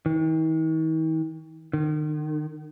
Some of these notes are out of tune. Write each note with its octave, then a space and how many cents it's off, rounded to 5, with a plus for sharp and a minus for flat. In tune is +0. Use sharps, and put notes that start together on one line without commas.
D#3 +45
D#3 -35